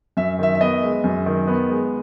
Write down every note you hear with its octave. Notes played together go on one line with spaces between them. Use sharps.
F#2 E5
D#3 E5
E5
B3 D#5
G#3
F#2
D#3
B3
G#3